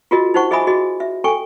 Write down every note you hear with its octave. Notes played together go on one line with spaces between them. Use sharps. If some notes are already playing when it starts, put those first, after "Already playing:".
F4 F#4 G#4 A#4 D#5
D#4 E4 C5 F#5 C#6
G#4 D#5 E5 G#5 B5 D#6
F#4 G#4 D#5
E5
A4 G5 G#5 C#6